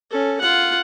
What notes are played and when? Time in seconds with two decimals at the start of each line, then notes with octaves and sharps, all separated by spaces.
0.10 C#4 A4
0.41 F4 F#5